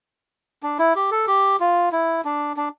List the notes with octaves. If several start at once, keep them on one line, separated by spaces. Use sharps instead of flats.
D4
E4
G4
A4
G4
F4
E4
D4
D4